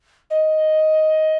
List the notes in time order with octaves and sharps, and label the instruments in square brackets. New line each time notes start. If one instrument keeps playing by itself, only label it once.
[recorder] D#5